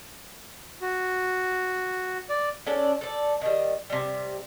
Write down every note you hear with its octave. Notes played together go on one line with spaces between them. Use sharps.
F#4
D5
C#4 D4 A4 D5
A4 D5
D#3 G3
C3 G3